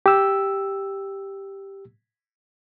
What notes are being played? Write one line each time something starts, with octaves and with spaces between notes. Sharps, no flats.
G4 E6